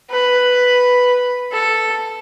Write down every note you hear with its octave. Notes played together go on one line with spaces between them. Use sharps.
B4
A4